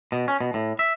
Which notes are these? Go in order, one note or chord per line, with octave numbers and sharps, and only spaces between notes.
B2
C#4
B2
A2
E5